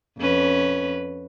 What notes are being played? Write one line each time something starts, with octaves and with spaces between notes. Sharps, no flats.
F2 C#4 B4